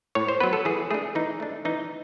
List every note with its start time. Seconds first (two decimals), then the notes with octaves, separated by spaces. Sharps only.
0.15 A2 C#5
0.28 C5
0.40 F#3 B3 B4
0.53 A4
0.65 E3 G#4
0.91 A3 D4 G#4
1.15 E3 D#4
1.40 A3 D4
1.65 E3 D#4